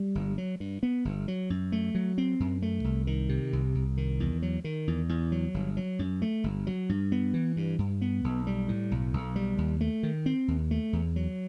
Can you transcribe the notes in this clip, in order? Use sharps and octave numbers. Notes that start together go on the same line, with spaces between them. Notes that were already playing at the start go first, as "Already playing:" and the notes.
Already playing: G3
G1
F#3
G2
B3
G1
F#3
F#2
A3
F#3
C4
F#2
A3
C2
D#3
C3
C2
C2
D#3
E2
F#3
D#3
E2
E2
F#3
G1
F#3
F#2
A3
G1
F#3
G2
B3
E3
G2
G2
B3
B1
G3
A2
B1
B1
G3
D#2
A3
D#3
C4
D#2
A3
E2
F#3